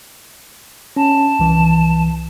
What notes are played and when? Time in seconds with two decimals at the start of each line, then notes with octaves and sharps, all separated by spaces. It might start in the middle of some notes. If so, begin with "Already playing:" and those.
0.96 C#4 A5
1.39 C2 E3